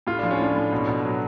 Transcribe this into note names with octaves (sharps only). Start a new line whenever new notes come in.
A2 F4
F3 D4
C#4
A2 D4
A2
B2
B2
F#3